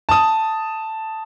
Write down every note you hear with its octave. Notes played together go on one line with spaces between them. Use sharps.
A5 D#6